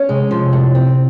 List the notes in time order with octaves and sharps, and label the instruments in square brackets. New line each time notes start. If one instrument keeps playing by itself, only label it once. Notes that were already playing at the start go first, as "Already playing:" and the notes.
Already playing: [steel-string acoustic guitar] C#4
[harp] C3 [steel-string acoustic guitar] G#3
[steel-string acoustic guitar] F3
A2
C4